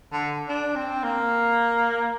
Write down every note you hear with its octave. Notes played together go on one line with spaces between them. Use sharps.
D3
D4
C4
A#3